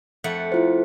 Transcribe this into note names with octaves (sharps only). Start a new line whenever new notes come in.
F2 A3 F#5
E4 F4 C5